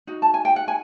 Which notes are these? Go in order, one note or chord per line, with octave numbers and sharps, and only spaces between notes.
D#4 F#4
A5
G#5
G5
F#5
G#5